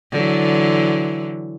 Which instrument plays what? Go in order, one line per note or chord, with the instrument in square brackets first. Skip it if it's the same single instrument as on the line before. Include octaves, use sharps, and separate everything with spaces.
[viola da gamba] D3 E3 F#3